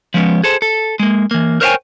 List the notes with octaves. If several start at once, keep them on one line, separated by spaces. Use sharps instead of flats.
F3 G#3 B3 C#4
G#4 A4 C5
A4
G#3 A#3
E3 A#3
A#4 C5 C#5 E5 G5 G#5